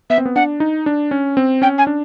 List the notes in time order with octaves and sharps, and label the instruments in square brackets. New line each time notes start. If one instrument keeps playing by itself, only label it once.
[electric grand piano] B3 [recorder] E5
[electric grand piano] C4
B3
[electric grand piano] D4 [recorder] F#5
[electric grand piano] D#4
D4
C#4
C4
[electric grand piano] C#4 [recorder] G5
[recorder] G#5
[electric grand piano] D4